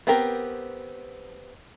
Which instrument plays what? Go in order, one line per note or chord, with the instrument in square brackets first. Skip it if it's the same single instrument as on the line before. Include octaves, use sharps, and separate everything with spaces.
[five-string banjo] B3 C4 G4 A#4